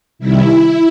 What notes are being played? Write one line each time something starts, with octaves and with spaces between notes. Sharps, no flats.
C3 D#3 G3 E4